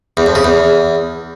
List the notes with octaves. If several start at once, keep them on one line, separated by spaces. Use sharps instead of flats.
E2
F2
C#3
E2